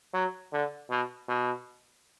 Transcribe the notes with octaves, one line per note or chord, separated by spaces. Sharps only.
F#3
D3
B2
B2